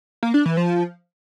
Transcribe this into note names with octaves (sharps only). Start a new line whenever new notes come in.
A#3
D4
E3
F3